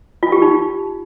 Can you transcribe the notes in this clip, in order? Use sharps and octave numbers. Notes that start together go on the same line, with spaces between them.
F4
G4
D#4